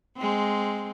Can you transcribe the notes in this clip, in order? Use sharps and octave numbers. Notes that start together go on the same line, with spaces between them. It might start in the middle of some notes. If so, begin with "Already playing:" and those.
G#3 C4